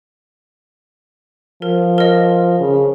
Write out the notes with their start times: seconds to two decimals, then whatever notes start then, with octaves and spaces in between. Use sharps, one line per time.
1.62 F3 A#4
1.98 A#4 D#5
2.60 C#3